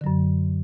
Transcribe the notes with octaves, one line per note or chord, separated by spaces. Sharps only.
F#2 D3 F#3